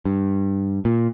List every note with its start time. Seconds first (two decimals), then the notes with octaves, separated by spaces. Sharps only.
0.05 G2
0.85 A#2